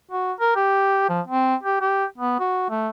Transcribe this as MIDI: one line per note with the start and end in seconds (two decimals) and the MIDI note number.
0.11 0.33 66
0.40 0.54 70
0.56 1.06 67
1.09 1.21 53
1.27 1.55 60
1.63 1.81 67
1.81 2.05 67
2.18 2.38 59
2.39 2.68 66
2.70 2.90 57